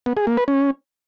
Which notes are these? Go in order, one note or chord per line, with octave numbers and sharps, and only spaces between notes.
B3
G#4
A#3
B4
C#4